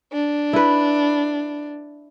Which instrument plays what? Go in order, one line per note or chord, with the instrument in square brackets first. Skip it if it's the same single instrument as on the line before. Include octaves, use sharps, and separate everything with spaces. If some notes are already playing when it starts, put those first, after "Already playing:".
[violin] D4
[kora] E4 B4